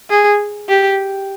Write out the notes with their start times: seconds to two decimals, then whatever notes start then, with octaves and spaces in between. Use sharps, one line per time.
0.10 G#4
0.68 G4